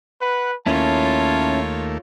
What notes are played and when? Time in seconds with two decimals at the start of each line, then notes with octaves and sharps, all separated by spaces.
0.21 B4 F#5
0.66 D#2 A3 A#3 C#4 E4 F4 C#5 A5